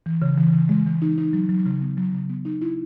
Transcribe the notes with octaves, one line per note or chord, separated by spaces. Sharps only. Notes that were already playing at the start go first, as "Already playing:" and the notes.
E3
C#3
E3
C#3
G#3
E3
D#4
D#4
F#3
F#3
C#3
B3
F#3
C#3
B3
D#4
E4